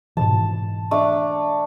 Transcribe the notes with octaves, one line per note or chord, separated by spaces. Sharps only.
G#2 B2 E3 A5
A3 D4 D6